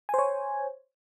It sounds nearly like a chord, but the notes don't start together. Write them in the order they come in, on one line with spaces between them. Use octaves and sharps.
G#5 C5 C#5